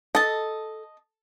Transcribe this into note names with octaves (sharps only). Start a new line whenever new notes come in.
A4 D#5 A5